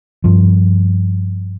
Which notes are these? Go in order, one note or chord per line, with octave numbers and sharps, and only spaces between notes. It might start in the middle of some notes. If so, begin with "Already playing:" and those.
G2 F3